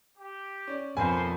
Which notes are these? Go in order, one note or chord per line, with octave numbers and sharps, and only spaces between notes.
G4
C#4 D5
B1 F2 A#4 C5 G#5 B5